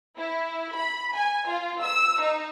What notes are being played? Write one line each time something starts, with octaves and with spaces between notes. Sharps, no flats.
E4
B5
G#5
F4
E6
D#4